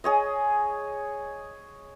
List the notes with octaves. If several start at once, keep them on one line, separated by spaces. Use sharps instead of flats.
G#4 C#5 D#5